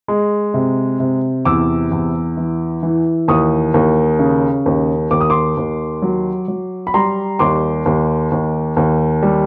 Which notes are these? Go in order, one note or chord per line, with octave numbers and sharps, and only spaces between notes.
G#3
C3
C3
E2 D6 E6
E2
E3
E3
D#2 C#6 D#6
D#2
C#3
D#2
D#2 D6
D#6
C6 D6
D#2
F#3
F#3
B5
G3 A#5 C6
D#2 C6 D6
D#2
D#2
D#2
G3